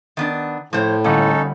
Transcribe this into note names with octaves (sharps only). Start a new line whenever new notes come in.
D#3 B3 D4
A2 F3 C5 C#5
G1 A#3 C#4 D#4 A4 F#5 G6